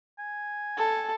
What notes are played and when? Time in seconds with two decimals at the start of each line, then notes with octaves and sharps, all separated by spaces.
0.18 G#5
0.78 A4